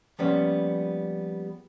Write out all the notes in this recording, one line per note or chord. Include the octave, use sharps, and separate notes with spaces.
F3 G3 A#3 B3 C#4